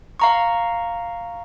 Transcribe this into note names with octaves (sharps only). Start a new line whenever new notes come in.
F5 A#5 C#6